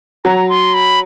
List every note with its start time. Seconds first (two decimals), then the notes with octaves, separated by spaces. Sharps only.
0.24 F#3 A#5
0.49 C6
0.74 B5